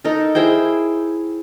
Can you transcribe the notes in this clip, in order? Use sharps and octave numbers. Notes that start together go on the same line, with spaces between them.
D#4 A4 A#4
E4 G#4 C5 G5